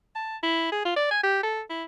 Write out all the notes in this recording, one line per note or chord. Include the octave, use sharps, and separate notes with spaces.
A5
E4
G#4
F4
D5
G#5
G4
A4
E4